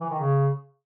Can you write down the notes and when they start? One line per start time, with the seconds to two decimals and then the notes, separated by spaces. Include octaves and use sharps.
0.01 E3
0.10 D#3
0.19 C#3